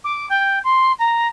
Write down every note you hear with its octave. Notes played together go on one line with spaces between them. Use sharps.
D6
G5
C6
A#5